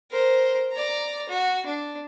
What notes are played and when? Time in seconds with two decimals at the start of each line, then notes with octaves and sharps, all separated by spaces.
0.11 A#4 C5
0.72 D5 A#5
1.29 F#4
1.66 D4